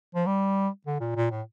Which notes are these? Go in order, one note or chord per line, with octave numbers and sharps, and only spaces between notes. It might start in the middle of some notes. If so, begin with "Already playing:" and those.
F3
G3
D3
A#2
A#2
A2